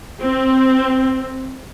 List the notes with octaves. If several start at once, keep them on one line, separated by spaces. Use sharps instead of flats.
C4